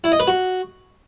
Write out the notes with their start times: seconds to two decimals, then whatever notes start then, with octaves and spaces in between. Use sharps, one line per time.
0.04 E4
0.12 D#5
0.20 B4
0.27 F#4